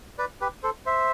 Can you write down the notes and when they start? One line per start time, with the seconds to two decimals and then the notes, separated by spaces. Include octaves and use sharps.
0.18 B4 D5
0.41 G4 B4
0.63 A4 C5
0.86 C5 E5